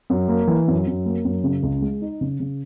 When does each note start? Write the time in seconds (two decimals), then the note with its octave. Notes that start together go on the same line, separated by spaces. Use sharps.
0.10 F#2
0.28 A#3
0.47 E3
0.68 F#2
0.87 F#2
1.06 A#3
1.25 F#2
1.44 C#3
1.63 C#2
1.82 G#3
2.01 D#4
2.21 C#3
2.40 C#3